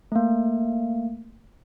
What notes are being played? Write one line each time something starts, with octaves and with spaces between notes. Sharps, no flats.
A3 A#3